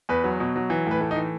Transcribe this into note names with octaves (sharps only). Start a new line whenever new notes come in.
E2 B4
F#3
B2
F#3
E3
A2 B4
A3
D#4
E3